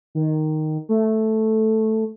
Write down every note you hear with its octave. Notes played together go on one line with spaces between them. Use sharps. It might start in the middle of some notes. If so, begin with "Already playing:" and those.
D#3
A3